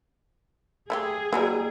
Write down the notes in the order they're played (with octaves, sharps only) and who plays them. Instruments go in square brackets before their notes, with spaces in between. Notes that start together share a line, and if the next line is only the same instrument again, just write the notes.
[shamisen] A3 E4 G4 [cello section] G#4
[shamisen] E3 F#3 G3 [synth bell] A#3 F#4